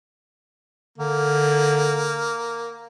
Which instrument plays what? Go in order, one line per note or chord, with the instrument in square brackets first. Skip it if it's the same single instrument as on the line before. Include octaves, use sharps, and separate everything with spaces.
[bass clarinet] D3 [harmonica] A#3